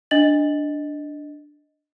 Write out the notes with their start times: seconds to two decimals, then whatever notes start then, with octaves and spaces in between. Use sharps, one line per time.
0.11 D4 D#5 A6 F#7